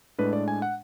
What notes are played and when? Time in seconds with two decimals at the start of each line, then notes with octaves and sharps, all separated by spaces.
0.18 A2 G#3 D4 B4
0.33 D5
0.48 G#5
0.62 F#5